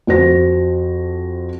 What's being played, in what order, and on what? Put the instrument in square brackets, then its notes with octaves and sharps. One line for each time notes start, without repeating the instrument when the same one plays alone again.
[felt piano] F2 F#4 C5 A#6